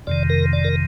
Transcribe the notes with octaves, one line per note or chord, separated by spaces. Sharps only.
F2 C3 D#3 D5
A#4
D5
A#4